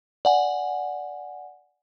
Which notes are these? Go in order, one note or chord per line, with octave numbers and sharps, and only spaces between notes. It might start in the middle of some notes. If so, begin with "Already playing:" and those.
D5 F#5 G#5